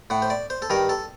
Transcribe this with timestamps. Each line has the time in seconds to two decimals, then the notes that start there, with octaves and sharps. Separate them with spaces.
0.10 A2 F#5
0.22 C5
0.30 D5
0.50 C5
0.62 A4
0.70 G2 D#3 A#4
0.89 A4